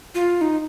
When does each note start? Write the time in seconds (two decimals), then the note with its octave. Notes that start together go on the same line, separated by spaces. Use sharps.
0.15 F4
0.41 D#4